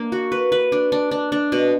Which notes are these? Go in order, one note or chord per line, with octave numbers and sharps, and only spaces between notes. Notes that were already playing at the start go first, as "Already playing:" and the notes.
Already playing: A#3 D4
F#4
B4
B4
D4
D4
D4
D4
B2